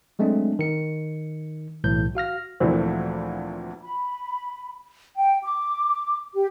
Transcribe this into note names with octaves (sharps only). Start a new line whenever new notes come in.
F#3 G#3 A3 C4 D4
D#3 C#7
B1 A2 E3 G6
F#4 F5 F6 A#6
D2 A#2 E3 F3 A3 C4
B5
G5
D6
G4